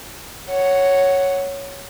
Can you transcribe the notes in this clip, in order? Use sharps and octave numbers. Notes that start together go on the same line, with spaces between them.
C#5 F#5